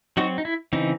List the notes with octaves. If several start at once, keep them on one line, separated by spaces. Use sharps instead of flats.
F#3 C4 D#4 F#4
D#4
E4
C#3 E3 C4 D#4